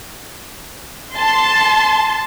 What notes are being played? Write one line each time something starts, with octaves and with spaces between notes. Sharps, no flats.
A5 C6